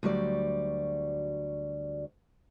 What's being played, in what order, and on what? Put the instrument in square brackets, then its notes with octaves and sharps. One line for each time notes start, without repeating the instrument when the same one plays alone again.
[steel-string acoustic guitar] D2 F#3 G3 D5